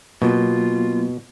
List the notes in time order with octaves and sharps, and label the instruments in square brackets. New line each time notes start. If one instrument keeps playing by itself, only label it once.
[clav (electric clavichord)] B2 [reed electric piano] F#3 A#3 B3 [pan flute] F4